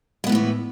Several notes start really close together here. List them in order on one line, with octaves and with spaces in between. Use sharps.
G#3 B3 A2 A3 E3